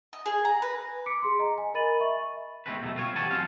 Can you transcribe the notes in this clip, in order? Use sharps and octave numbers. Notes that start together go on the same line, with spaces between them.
D#5
G#4
A#5
B4
D6 B6 C#7 D7
G#4 C6
D#5 A#5
G#5
A#4 D#5 B5 A6 D#7 F#7
E5 C#6
E2 B2 G#3 A3 C4 B4
B2 D3 F#3 A3
C4 F4 C#5
E3 G4 F#5 G#5 A5
F#3 C4 C5 F5